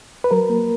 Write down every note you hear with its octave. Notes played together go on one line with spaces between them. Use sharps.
B4
F#3 A#4
A#3